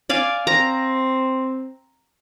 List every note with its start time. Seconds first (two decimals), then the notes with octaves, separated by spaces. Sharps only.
0.09 D5 F5 G#5
0.47 C4 A#5